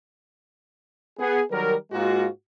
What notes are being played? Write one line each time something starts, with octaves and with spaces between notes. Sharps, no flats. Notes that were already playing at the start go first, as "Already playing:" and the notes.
B3 G#4
D#3 F#3 G3 A#4
G#2 G#3 A#3 F4 F#4